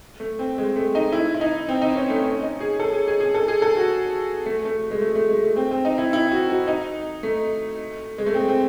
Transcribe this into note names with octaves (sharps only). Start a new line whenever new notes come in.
A3
C4
G#3
A3
D#4
E4
E4
D#4
C4
D#4
C#4
A3
C#4
D#4
G#4
A4
G#4
G#4
G#4
A4
G#4
A4
F#4
A3
A3
G#3
A3
A3
G#3
A3
C4
C4
D#4
E4
E4
F#4
F#4
D#4
A3
G#3
A3
C4
C4